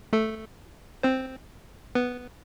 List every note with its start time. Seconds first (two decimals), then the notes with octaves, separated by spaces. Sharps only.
0.13 A3 A4
1.03 C4 C5
1.95 B3 B4